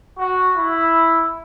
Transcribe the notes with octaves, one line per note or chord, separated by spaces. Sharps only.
F#4
E4